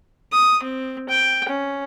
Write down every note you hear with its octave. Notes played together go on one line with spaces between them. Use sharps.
D#6
C4
G5
C#4